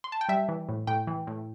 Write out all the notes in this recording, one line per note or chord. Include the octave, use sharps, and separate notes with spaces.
C6
A5
G5
G3 E5
E3
A2
A2 G5
E3
A2